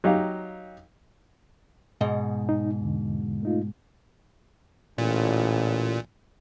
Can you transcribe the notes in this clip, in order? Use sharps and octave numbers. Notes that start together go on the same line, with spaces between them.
F#3 D#4 G4 F5
G#2 B2 D#5
D#4
E2 D3
A3 D#4 F4
A1 A#2